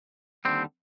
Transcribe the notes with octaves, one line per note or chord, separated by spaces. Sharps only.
D#2 D3 G3 C4